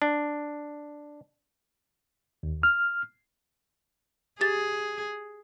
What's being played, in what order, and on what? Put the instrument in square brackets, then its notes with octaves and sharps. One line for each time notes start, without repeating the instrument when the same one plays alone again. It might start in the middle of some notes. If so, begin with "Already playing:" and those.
[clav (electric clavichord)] D4
[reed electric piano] D#2
F6
[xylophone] G4 A6 [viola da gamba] G#4